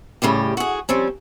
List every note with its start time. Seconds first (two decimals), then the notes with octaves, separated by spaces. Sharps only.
0.22 A2 C#3 G3 G4
0.57 F#4 G#4
0.89 F3 G3 C4 C#4